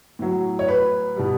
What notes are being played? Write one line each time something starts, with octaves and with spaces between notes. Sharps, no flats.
A2 F#3
C#5
B4
B2 G3